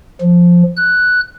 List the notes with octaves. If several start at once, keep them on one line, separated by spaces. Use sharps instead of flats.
F3
F#6